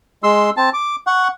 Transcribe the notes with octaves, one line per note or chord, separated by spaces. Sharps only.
G#3 C6 E6
C4 A5
D6
F#5 C#6